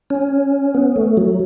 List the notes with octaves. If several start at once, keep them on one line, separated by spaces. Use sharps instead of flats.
C#4
B3
A3
F#3